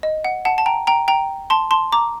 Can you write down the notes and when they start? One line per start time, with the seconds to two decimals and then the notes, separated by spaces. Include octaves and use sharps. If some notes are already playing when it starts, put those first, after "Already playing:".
0.03 D#5
0.25 F#5
0.45 F#5 A5
0.58 A5
0.66 G5 A#5
0.87 G5 A#5
1.08 G5 A#5
1.50 A5 C6
1.71 A5 C6
1.92 A#5 D6